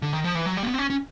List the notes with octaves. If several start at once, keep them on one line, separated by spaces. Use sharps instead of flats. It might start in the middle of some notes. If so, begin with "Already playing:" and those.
D3
D#3
F3
E3
F#3
G3
A#3
B3
C4
C#4
C#4